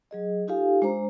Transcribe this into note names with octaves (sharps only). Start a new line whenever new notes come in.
F#3 G#4 D#5
D#4 F4 G4 A4 F5 G#5
G#3 D4 C5 A#5